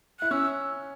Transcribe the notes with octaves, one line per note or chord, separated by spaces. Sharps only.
E4 F#6
C#4 E6